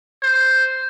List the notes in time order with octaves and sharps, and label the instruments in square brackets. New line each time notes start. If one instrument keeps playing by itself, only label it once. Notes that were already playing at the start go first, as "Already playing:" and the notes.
[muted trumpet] C5